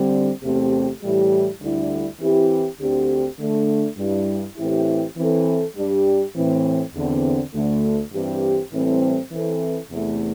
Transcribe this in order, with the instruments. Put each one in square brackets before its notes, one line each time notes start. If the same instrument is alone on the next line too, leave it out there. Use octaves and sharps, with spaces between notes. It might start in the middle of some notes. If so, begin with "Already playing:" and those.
Already playing: [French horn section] D3 G3 C4
E2 C3 A3 C4 G4
A2 E3 G3 E4 G4
D2 D3 G3 E4
E3 C4 E4 G4
D2 D3 C4 G4
D3 A3 D4
G2 G3 E4
A2 E3 C4 E4 G4
E3 C4 A4
G2 G3 D4 G4
A2 E3 C4
E2 D3 C4
D2 D3 A3
G2 E3 C4 G4
A2 E3 G3 C4 A4
E3 C4 A4
E2 C3 E3 A3